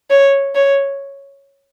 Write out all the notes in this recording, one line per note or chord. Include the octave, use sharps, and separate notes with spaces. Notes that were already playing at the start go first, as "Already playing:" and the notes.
C#5
C#5